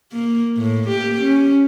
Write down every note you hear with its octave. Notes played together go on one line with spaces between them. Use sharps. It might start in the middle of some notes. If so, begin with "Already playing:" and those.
A#3
A2
A#3 G4
C#4